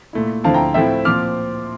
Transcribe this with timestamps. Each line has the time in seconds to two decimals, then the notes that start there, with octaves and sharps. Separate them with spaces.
0.13 A#2 A3 E4
0.44 D2 D3 F3 C4 E4 F5 A5
0.54 G5 A#5
0.74 A2 F3 A3 C4 E4 E5 G5
1.05 A#2 F3 C4 D6 F6